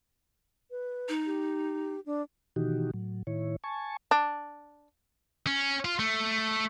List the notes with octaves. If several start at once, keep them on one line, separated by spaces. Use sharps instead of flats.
B4
D#4
G4
D4
B2 D#3 E3 D#4 F#4 G4
A2 F#3
A2 D#3 E4 C#5
G#5 A5 C#6
D4
C#4
F4
A3